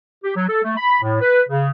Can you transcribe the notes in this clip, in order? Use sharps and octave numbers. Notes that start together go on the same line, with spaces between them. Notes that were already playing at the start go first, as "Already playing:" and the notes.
G4
F#3
A4
A3
B5
A2
B4
C#3